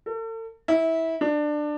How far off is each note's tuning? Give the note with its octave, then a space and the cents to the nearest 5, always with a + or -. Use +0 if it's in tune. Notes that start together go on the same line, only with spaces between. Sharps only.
A4 +40
E4 -20
D4 +20